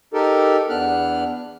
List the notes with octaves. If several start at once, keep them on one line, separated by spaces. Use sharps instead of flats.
D#4 G4 A4 A#4
E2 B3 D4 F6 F#6